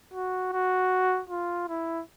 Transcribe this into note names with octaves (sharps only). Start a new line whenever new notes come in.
F#4
F#4
F4
E4